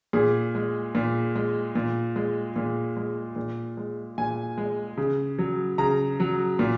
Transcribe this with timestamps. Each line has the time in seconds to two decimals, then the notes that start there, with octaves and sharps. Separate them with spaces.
0.13 A#2 G#4
0.55 G#3
0.95 A#2
1.35 G#3
1.76 A#2
2.16 G#3
2.56 A#2
2.97 G#3
3.36 A#2
3.77 G#3
4.18 A#2 G#5
4.58 G#3
4.97 C#3
5.39 F#3
5.78 C#3 A#5
6.20 F#3
6.59 A#2